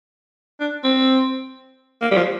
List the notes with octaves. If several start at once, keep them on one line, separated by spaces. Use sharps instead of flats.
D4
C4
A#3
G3
F3